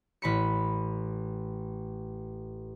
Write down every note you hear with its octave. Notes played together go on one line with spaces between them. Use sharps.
A1 B5 C#7